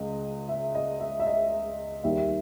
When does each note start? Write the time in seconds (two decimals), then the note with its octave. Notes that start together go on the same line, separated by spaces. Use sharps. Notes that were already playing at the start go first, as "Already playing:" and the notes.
Already playing: C#2 D#5
0.49 E5
0.75 D#5
1.00 E5
1.19 E5
1.27 D#5
2.04 D#2 D#3 G3 E5